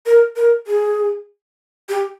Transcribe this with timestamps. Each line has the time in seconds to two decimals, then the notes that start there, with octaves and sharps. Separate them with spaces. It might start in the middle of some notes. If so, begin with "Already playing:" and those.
0.06 A#4
0.36 A#4
0.67 G#4
1.89 G4